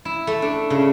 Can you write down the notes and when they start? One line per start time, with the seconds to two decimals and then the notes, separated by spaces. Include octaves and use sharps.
0.05 E4
0.27 A3
0.42 D4
0.70 C#3